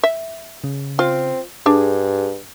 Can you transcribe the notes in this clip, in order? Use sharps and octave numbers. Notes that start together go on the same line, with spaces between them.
E5
C#3
C4 F4
G2 D4 G#4